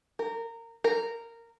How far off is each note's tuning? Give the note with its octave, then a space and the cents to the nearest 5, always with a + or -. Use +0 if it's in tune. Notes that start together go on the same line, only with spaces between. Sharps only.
A#4 -20
A#4 -15